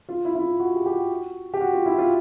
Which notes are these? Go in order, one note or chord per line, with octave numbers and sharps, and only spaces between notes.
F4
E4
E4
F4
F#4
G4
G4
F#4
G4
F#4
F4
E4
F4